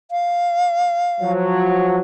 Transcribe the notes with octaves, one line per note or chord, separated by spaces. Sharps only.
F5
F3 F#3